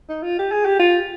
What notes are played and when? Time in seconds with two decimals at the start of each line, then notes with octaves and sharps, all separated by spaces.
0.09 D#4
0.22 F4
0.39 G4
0.51 G#4
0.65 G4
0.79 F4